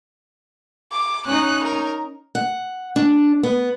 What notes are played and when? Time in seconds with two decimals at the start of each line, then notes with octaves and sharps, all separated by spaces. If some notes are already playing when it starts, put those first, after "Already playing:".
0.92 D6
1.26 C#4 D#4 F#6
1.64 A#4
2.35 F#5
2.96 D4
3.43 B3